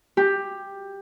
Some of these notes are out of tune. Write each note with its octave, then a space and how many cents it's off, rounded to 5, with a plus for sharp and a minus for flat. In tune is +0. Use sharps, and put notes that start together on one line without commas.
G4 +10